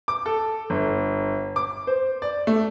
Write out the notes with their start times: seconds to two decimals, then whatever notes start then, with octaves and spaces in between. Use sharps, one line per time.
0.08 D6
0.26 A4
0.70 G1
1.56 D6
1.87 C5
2.22 D5
2.47 A3